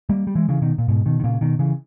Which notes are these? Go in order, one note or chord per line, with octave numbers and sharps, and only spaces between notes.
G3 A#3
G3
E3 G#3
C#3 E3
B2 D#3
A#2
G#2 B2
B2 D#3
D#3
A#2 C#3
B2 D#3
C#3 E3